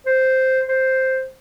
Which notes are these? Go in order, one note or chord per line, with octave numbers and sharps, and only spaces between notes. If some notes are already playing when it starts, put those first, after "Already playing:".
C5
C5